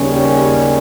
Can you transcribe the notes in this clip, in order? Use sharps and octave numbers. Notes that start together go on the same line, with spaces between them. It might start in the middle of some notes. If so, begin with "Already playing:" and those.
Already playing: D#2 C#3 G3 C#4
G4